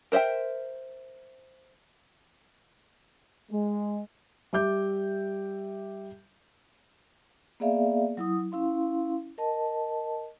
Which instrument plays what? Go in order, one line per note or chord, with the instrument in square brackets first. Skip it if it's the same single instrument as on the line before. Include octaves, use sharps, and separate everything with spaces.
[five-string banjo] A#4 C5 D#5 E5 G5
[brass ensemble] G#3
[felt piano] G3 E5 D6 G6
[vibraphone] A#3 B3 G#4 D5 E5 F5
F#3 E4 D#6
C#4 E4 F5 C6
A#4 D#5 A5